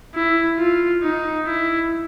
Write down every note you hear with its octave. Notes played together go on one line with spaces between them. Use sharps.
E4
F4
D#4
E4